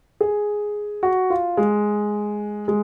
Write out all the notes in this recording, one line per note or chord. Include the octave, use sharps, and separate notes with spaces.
G#4
F#4
F4
G#3
G#3